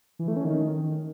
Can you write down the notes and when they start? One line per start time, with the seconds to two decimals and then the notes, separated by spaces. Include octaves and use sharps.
0.19 E3
0.28 A3
0.36 C#4
0.45 D#3